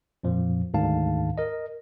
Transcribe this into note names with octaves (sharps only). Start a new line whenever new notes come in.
F2 A#2 F3
D2 G#2 D#3 F5 A5
A#4 D#5